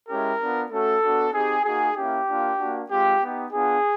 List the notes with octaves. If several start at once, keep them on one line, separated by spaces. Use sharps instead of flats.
G#3 C#4 E4 G4 A#4
B3 D4 F4
A3 C#4 F#4 A4
B3 D4 F#4
C4 D#4 G4 G#4
A#3 D#4 F#4 G#4
A#3 C#4 E4 G4
A#3 D4 F4
A#3 D4 F#4
G#3 C4 F4 G4
B3 D#4 G4
B3 D4 F4 G#4